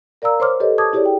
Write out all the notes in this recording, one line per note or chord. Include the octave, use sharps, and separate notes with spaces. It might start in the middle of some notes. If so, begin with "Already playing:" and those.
A#4 D5 F5 A#5 E6
C5 C#5 C6 D6 F6
G4 A4 B4 C#5 D#5
A5 D6 D#6 G#6
E4 G4 G#4 C#5 D5
G5